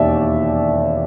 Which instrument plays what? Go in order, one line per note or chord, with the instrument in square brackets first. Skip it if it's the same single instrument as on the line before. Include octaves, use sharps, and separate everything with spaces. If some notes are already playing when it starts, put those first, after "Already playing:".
Already playing: [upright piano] E1 D#2 D5 E5